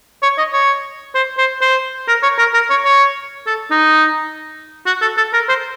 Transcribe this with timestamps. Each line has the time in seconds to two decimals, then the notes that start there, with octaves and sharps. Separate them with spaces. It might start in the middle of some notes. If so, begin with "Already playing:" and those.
0.23 C#5
0.38 D#5
0.53 C#5
1.15 C5
1.38 C5
1.61 C5
2.08 A#4
2.23 C#5
2.39 A#4
2.54 A#4
2.70 C#5
2.85 C#5
3.47 A4
3.71 D#4
4.86 F#4
5.02 A4
5.17 A4
5.33 A#4
5.49 C5